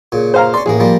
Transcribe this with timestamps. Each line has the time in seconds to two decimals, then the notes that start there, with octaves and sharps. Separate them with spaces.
0.12 A#2 C#3
0.34 C5 F5 A#5
0.54 C#4 D5 C6
0.66 A1 A2 A#3 G#4
0.80 F3 G3 A#3